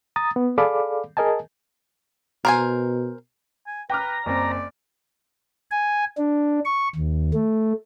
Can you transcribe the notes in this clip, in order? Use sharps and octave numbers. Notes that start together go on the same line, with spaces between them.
A#5 D#6 A6
B3
G#4 A4 D5 F5 B5 D6
G#4 A#4 D#5 G#5 A5
B2 A#4 C5 G#5
G#5
B4 G5 A#5 D6 F6
F#1 C4 D5
G#5
D4
C#6
D#2
A3